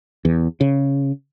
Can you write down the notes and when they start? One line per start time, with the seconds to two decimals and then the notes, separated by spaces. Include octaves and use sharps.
0.25 E2
0.61 C#3